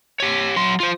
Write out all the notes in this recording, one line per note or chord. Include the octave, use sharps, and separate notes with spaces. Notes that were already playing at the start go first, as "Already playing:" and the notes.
G4 C#5
F#3 C6
F4 C5